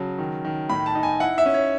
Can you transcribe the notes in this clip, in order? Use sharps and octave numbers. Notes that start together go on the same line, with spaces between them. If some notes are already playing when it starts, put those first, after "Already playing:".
Already playing: C#3 F#3 A5
D#3
D#3
A2 B5
A5
D#4
G#5
E4 F#5
E5
C#4
C#5